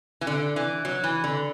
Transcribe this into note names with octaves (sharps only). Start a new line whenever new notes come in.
E3
D3
E3
F#3
E3
D3